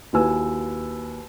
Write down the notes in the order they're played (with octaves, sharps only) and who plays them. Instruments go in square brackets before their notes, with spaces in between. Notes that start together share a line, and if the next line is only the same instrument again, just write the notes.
[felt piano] D#2 E4 F#4 B4 G#5 E6